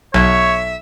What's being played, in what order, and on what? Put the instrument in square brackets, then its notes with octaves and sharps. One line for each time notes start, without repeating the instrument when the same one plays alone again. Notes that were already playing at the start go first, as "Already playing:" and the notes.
[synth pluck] B1 [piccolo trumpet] C#5 [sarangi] E5